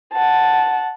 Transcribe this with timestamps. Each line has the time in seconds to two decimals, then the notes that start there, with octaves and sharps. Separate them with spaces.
0.13 F#5 A5